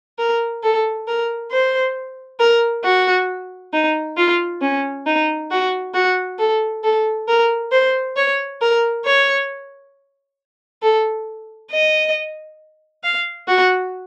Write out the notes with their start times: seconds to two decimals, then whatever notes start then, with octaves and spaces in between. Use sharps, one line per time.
0.19 A#4
0.63 A4
1.08 A#4
1.52 C5
2.40 A#4
2.84 F#4
3.73 D#4
4.17 F4
4.62 C#4
5.06 D#4
5.51 F#4
5.94 F#4
6.38 A4
6.83 A4
7.28 A#4
7.72 C5
8.17 C#5
8.61 A#4
9.05 C#5
10.82 A4
11.72 D#5
13.03 F5
13.48 F#4